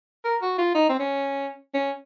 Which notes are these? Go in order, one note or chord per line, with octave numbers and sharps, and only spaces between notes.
A#4
F#4
F4
D#4
C4
C#4
C#4